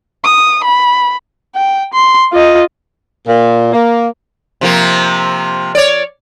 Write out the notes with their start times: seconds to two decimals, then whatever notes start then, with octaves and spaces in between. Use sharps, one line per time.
0.24 D#6
0.64 B5
1.55 G5
1.93 C6
2.32 F4 D#5
3.27 A#2
3.73 A#3
4.61 C3 F3 A#3
5.75 C#5 D5